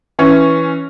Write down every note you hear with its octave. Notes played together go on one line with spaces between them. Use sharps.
E3 C#4